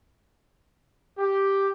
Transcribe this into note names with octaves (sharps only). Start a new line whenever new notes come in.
G4